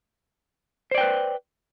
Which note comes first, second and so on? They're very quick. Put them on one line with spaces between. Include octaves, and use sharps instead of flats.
C5 D5 G5 B4